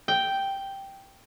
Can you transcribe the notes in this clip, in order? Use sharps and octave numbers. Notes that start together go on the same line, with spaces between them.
G5